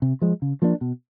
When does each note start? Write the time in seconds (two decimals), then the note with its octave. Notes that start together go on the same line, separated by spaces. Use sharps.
0.02 C3
0.22 F3 G#3
0.42 C#3
0.62 F3 A#3 D4
0.81 B2